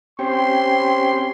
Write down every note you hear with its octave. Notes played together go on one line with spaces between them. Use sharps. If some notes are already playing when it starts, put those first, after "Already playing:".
C4 C#4 G4 C6